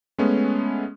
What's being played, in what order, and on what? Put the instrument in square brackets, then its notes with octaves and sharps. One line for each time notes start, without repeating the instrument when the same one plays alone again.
[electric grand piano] G#3 A3 B3 C#4